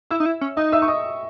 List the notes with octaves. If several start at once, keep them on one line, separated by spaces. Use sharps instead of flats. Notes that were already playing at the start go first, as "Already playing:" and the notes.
E4 E5 E6
D#4
E4
C#4
D#4 D#5 D#6
E5 E6
C#6
D#5 D#6